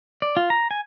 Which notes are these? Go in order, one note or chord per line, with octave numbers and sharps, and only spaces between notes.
D5
F4
A#5
G#5